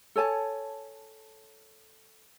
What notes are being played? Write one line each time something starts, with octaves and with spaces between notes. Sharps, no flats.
A4 C#5 G#5 A5